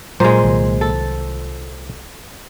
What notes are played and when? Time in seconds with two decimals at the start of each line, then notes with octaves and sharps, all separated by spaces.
0.20 A#2 F#3 G#3 C5
0.44 C2 D#3 F#3
0.81 A4